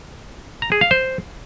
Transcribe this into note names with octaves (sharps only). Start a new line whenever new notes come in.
A#5
G#4
F5
C5